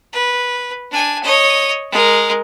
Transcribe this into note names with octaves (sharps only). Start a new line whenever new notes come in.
B4
D4 G#5
C#5 D#5
G#3 A#4